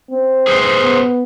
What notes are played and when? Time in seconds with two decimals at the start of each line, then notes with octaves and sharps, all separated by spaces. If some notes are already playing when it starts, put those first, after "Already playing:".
0.10 C4
0.47 G#4 B4 C5
0.81 B3